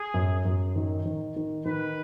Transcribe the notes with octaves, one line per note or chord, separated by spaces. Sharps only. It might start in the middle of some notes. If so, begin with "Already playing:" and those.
Already playing: G#4
F#2
F#2
D#3
D#3
D#3
D#3 B4